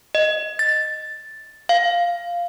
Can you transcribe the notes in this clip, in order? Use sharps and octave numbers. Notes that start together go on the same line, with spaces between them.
D#5
A6
F5